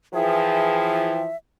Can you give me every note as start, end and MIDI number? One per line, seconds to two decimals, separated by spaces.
0.14 1.26 52
0.14 1.26 53
0.14 1.12 68
0.14 1.36 76
0.14 1.22 79